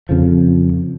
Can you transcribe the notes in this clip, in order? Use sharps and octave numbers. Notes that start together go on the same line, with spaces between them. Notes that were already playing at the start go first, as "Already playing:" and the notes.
F2 C#3 F3